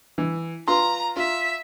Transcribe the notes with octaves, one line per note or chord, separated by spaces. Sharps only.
E3
F4 B4 A#5 C6
F4 E5